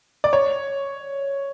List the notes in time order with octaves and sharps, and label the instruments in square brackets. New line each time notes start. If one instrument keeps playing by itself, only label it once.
[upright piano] D5
C#5